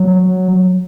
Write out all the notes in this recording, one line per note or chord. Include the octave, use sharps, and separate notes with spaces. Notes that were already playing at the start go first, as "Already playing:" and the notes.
Already playing: F#3